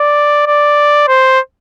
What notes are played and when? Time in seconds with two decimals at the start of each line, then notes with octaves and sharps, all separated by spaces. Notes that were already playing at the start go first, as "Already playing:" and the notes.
Already playing: D5
0.47 D5
1.08 C5